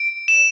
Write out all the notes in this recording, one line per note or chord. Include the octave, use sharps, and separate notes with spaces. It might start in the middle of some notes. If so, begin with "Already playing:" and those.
Already playing: D7
E7